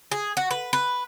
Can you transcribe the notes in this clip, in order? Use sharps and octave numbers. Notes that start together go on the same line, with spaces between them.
G#4
F#4
B4
B4